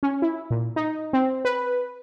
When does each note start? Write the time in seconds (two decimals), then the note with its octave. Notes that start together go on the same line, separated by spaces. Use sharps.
0.03 C#4
0.22 E4
0.50 A#2
0.76 D#4
1.13 C4
1.45 B4